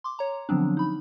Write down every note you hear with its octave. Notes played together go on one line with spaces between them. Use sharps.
C6 D6
C#5 A#5
D3 F3 F#3 B3 C4 D4
D#4 B5